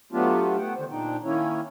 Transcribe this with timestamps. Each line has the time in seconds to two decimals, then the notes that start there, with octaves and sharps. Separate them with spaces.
0.12 F#3 A3 B3 D4 F4 G4
0.58 A3 B3 F#5 G5
0.75 D3 D#3 C5
0.91 A#2 D4 D#4 G5
1.24 D#3 A#3 C#4 E4 C#5